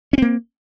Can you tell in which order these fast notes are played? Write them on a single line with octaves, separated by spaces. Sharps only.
C#4 C4 A#3